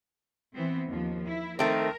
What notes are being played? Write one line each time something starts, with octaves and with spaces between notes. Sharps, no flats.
E3 B3 C4
D#2 F3
E4
D#3 A3 C4 A#4